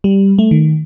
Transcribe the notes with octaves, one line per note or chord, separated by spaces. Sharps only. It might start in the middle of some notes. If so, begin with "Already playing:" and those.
G3
A3
D#3